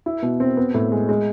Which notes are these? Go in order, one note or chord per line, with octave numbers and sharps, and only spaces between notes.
E4
B2
C4
B3
A2
G#3
G#3